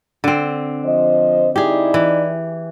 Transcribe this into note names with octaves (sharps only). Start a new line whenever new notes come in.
D3 C4
F3 C5 D#5
D#4 E4 G4 G#4 D5
E3